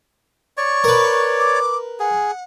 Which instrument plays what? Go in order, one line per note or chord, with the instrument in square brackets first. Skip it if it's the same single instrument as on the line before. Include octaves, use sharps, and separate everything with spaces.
[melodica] C#5 D5 [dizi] C#6
[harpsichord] A#4 B4
[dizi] D6
[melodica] G#4 [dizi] F#5